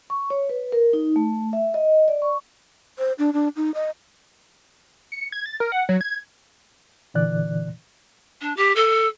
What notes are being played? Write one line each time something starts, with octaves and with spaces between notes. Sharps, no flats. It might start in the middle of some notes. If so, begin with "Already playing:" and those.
C#6
C#5
B4
A#4
D#4
A3
E5
D#5
D5
C#6
C5
D4
D4
D#4
D#5
C#7
G#6
A6
A#4
F#5
F#3
G#6
A#2 D3 E3 D5 F#6
D4
G4
A4